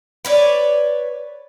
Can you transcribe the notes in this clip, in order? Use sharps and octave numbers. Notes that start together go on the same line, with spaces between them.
B4 C#5 D5